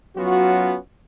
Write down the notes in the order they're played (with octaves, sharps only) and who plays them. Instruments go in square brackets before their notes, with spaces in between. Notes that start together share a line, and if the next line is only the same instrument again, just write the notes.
[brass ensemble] F#3 B3 C#4 F4 F#4